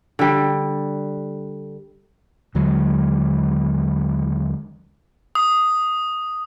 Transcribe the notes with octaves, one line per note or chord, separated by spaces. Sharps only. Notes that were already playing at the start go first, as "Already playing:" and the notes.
D3 G3
D#2 D3 F#3 G#3
D#6